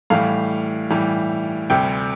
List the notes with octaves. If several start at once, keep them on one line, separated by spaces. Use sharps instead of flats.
A2 E3 G3 F5
A2 E3 G3
D2 C3 G3 G5